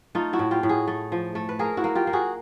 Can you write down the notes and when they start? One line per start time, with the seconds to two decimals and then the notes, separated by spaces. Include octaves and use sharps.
0.15 A3 D#4 F4
0.33 E4 F#4
0.39 A2
0.51 F4 G4
0.63 A2
0.69 F#4 G#4
0.88 A3
1.12 F3
1.35 A3
1.49 B4
1.59 A#3 G#4 A#4
1.77 E4 F#4
1.84 A#3
1.95 F4 G4
2.07 A#3
2.13 F#4 G#4